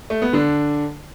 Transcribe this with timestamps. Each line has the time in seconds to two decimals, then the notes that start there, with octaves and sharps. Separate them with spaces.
0.10 A3
0.22 B3
0.33 D3 D4